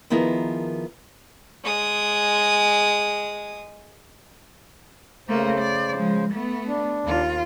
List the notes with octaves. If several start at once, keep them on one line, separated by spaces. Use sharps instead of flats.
D#3 F3 B3 E4 G#4 A#4
G#3 D#6
C#3 A3 A#3 C5
D5
F3 G#3
A3 B3
D4
D#2 F4